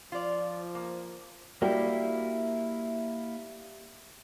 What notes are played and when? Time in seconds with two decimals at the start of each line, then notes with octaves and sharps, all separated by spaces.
0.12 F3 F4 D5
0.75 A#3
1.62 G3 A#3 E4 F#4 G4